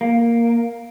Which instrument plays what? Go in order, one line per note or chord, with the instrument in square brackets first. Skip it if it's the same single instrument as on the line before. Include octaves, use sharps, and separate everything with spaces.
[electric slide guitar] A#3